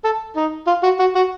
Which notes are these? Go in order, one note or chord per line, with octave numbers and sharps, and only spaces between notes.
A4
D#4
F4
F#4
F#4
F#4